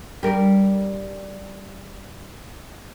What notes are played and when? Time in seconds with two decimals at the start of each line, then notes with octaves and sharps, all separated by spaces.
0.23 G3 A#4